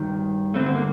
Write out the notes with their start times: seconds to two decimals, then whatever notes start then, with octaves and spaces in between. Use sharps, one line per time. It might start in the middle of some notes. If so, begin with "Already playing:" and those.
Already playing: G2 D#3
0.54 G2 D3 A3 C4
0.66 C4
0.75 A#3